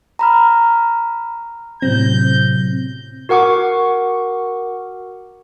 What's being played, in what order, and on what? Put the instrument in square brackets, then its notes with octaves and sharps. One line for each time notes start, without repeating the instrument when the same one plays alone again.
[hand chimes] A#5 B5 F6
[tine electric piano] A2 C3 F#3 [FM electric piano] C4 A#6 [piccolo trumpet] G6
[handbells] F#4 A#4 F#5 C#6 D6